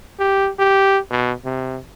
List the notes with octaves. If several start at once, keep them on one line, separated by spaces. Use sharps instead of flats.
G4
G4
B2
C3